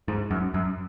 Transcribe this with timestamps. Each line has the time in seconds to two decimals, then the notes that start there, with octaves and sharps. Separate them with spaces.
0.08 G#2
0.31 F#2
0.54 F#2